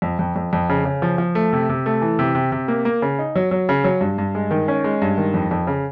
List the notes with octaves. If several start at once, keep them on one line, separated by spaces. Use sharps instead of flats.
F2
F2
F2
F2
C#3
C#3
F3
F3
A3
C3
C3
A3
E3
C3
C3
C3
A#3
A#3
C#3
D#4
F#3
F#3
C#3
F#3
G2
G2
G#3
D#3
C#4
G#3
G2
D#3
F2
F2
C#3